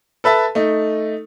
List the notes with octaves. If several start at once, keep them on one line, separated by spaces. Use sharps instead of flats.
A4 B4 E5 A5
A3 D#4